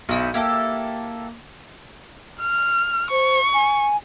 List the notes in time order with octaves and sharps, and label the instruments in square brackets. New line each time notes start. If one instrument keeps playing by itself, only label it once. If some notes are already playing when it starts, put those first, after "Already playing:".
[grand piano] B1 [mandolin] D#4 E4 F#5
[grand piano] A#3 [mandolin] E4 G4 A4
[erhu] F6
[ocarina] C5 [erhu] C#6
[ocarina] G#5